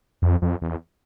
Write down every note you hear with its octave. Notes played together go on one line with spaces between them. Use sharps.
F2
F2
E2